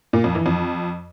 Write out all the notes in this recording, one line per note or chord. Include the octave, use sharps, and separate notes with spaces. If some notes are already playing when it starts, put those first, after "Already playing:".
A#2
F2
E3
F2